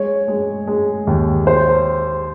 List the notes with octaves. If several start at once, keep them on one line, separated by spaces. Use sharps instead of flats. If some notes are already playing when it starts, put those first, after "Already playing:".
Already playing: G#3 C#5
G#3
G#3
D#2
C5